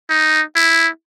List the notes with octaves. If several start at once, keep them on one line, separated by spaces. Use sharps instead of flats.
D#4
E4